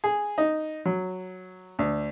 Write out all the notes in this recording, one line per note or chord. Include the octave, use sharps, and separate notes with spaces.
G#4
D#4
F#3
D2